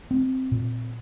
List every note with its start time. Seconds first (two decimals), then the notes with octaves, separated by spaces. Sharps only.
0.11 C4
0.51 A#2